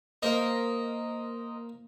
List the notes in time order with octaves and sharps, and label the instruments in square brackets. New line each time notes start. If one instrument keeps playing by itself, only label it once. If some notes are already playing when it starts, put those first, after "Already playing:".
[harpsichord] A#3 [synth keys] A#4 C5 D#5